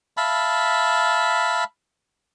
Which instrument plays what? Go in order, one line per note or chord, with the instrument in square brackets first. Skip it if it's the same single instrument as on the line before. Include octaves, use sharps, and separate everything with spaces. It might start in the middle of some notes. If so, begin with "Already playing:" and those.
[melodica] E5 F5 A5 B5